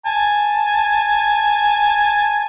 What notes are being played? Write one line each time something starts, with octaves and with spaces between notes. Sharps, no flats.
G#5 A5